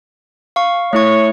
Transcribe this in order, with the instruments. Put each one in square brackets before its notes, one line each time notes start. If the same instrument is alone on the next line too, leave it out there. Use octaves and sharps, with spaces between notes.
[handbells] F5 C#6
[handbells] A3 E4 C#6 [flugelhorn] C#5